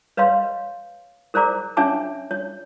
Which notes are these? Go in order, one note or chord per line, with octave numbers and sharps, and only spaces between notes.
B4 C#5 D#5 F5 C6
A#4 C5 D5 A#5 D6
C#4 D4 C#5 E5 A5 D6
C#5